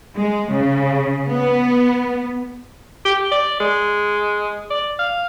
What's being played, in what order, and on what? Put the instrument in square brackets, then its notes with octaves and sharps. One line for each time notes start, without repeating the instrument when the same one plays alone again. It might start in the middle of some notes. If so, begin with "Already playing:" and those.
[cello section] G#3
C#3
B3
[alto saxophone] G4
D5
G#3
D5
F5